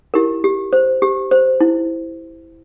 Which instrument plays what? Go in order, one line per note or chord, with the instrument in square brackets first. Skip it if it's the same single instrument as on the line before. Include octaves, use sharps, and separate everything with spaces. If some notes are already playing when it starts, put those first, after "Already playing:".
[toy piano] E4 G4 A#4
G4
C5
G4
C5
E4